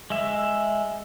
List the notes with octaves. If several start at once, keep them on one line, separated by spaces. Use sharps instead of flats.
G#3 E5